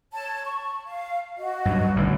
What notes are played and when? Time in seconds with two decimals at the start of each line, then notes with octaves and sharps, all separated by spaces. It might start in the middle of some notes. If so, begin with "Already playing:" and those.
0.13 C#5 A5
0.44 C#6
0.86 F5
1.39 F#4 D#5
1.65 G2 F#3
1.96 A1 D3 G3